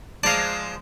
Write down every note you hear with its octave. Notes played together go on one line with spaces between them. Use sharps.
F3 G#3 D5 F5 A5 A#5